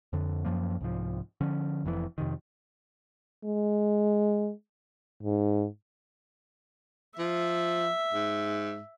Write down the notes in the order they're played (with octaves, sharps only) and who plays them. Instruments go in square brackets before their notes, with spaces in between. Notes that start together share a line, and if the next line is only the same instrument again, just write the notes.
[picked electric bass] F2 D3
F#2 F3 A#3
C2 G#2 F3
D3 F3 C#4
F1 F2 B2 E3
F2 C3 D#3
[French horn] G#3
G#2
[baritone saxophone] F3 [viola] E5
[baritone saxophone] G#2